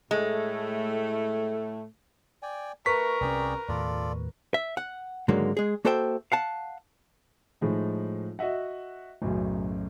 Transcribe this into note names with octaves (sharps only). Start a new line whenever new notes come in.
A2 G#3 A3
D5 G5 G#5
A3 A#4 B4 C#6 B6
C2 C3 C#4 G#4 D5 G5
D#2 A2 F4 A4 D5
E5
F#5
G#2 D3 D#3 F#3 G#3 A#3
G#3 G#4
A#3 F#4 A4 C5 E5 G5
F5 F#5 A5
A2 F3 G#3 D#4
F#4 D#5 E5 F#5
B1 F#2 A2 C#3